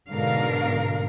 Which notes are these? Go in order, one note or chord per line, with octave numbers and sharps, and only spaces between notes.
G#2 B2 D3 A#4 F5